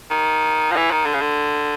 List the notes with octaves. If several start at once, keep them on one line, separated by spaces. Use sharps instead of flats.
D#3
F3
E3
D#3
D3
C#3
D3